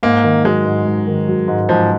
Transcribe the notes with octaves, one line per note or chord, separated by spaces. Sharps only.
G#2 A#3
D#3
F#3 G#3
G#2
G#2
D#3
F#3
G#2
G#2 F3